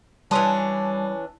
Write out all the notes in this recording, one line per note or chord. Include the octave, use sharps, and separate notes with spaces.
E3 G3 C#4 D4 A5 C6 D#6